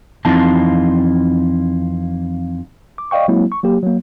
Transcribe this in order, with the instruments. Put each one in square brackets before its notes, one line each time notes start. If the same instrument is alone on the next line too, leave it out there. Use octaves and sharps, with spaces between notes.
[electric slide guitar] F2 E3 C4 D#4 F4 A5
[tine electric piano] D6
D5 D#5 F5 G5 C#6
F#3 G#3 A#3 C4 E4
C#6
F#3 A#3 G4
F#3 A#3